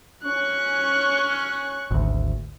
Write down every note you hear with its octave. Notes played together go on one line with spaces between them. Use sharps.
C#4 C#6 F#6
G#1 D2